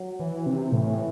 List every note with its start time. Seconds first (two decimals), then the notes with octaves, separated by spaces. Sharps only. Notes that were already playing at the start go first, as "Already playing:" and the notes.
Already playing: F#3
0.20 E3
0.46 C3
0.72 A2 E3